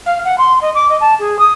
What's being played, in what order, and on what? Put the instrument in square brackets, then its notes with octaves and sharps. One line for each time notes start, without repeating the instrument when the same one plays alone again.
[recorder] F5
F#5
C6
D#5
D6
D#5
A5
G#4
D#6